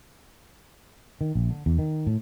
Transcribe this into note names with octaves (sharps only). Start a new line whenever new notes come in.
D#3
A#1
D3
E2
D#3
A2